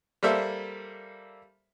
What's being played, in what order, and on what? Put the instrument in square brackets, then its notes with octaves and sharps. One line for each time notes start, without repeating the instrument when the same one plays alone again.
[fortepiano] G3 A#3 A4 C5 E5